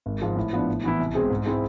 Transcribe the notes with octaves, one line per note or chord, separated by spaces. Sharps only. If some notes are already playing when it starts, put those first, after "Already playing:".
G#1
G#2 F3 G#3
A2
F3 B3 D4
A2
E3 B3 E4
C2
B2 G#3 C4 G#4
G#2
G#3 C4 E4 G#4